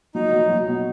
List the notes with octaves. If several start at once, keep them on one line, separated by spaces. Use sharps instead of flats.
F#3 D#4
F#3
F#3
B2